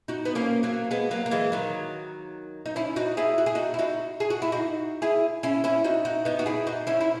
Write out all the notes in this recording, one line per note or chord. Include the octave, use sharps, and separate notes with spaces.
D#4 F#4
B3
A#3 C#4
F#3 A#3
G#3 B3
F#3 A#3
A#3
E3 G#3
D#3 F#3
D#4
C#4 E4
D#4 F#4
E4 G#4
F#4
G#4
D#4 F#4
E4
D#4 F#4
G#4
F#4
E4
D#4 F#4
E4 G#4
C#4 E4
C#4 E4
D#4 F#4
D#4 F#4
B3 D#4
F#4
E4 G#4
D#4 F#4
C#4 E4
E4